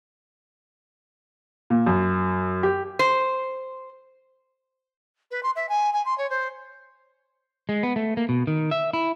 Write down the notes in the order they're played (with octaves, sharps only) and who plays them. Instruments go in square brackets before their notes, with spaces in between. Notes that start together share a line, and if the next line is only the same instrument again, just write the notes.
[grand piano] A#2
F#2
G4
[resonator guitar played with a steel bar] C5
[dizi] B4
C6
E5
G#5
G#5
C6
C#5
C5
[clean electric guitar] G#3
B3
A3
A#3
B2
D#3
E5
E4